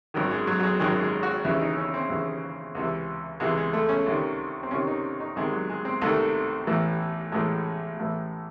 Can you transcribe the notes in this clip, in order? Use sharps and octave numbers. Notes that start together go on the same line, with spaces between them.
G#1 F#2 D#3
G#3
F#3
F#3
G#3
G#1 F#2 D#3 G#3
G#3
F#4
D#2 C#3 E3 E4
D#4
C#4
C4
D#2 C#3 E3
C#2 C3 E3
C#2 C3 E3 G#3
G#3
A3
C#4
C2 C3 D#3
C4
C2 C3 D#3 C#4
D#4
D#4
C2 C3 D#3 G#3
F#3
G#3
C4
C2 C3 D#3 A3
A1 A2 E3
A1 A2 E3 G#3
A1 A2 E3